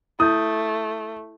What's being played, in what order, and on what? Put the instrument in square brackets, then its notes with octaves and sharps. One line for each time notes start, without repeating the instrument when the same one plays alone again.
[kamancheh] A3 [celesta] E4 G6 [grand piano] D#6